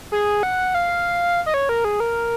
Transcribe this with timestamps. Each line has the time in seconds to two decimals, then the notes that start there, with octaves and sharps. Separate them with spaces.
0.12 G#4
0.43 F#5
0.75 F5
1.46 D#5
1.54 C#5
1.69 A#4
1.85 G#4
2.00 A#4